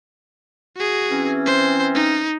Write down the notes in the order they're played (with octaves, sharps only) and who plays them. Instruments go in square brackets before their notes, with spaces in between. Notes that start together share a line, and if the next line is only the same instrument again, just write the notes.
[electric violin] F#4 G#4
[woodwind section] E3 C4 C#4
[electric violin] C5
D#4